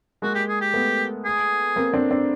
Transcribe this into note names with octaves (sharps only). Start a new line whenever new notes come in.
G#3 A#3 F#4
G4
G#4
G4
A3 B3
G#4
A#3 C4
C4 D4
C4 D4